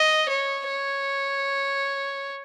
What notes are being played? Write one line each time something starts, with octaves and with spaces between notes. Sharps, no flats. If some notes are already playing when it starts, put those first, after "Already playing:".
Already playing: D#5
C#5
C#5